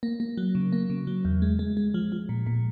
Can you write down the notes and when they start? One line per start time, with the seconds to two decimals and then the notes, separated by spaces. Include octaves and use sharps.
0.03 A#3
0.20 A#3
0.37 F#3
0.55 C#3
0.72 A#3
0.90 C#3
1.07 F#3
1.25 E2
1.42 G#3
1.59 G#3
1.77 G#3
1.94 F3
2.12 F3
2.29 A#2
2.47 A#2